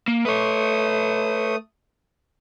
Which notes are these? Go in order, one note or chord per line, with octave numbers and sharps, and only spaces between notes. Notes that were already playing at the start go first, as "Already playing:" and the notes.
A#3
A3 B4 C#5 D#6